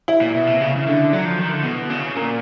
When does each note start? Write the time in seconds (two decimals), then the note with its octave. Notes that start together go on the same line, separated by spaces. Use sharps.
0.08 E4
0.21 A#2
0.34 B2
0.47 C3
0.61 C#3
0.76 C#3
0.87 D3
1.13 F#3
1.25 F3
1.39 D#3
1.51 D3
1.64 B2
1.90 C#3
2.16 A#2 A#4